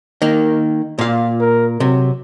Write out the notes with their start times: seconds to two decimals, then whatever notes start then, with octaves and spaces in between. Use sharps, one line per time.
0.22 D#3 A#3
0.99 A#2 F4 F5
1.40 A#4
1.80 C3 F#3